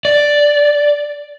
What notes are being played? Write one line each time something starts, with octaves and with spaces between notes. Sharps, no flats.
D5